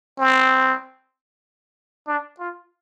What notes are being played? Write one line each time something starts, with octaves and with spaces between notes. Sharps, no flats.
C4
D4
F4